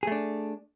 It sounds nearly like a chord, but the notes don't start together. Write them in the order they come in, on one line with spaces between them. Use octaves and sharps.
G#4 A3 D4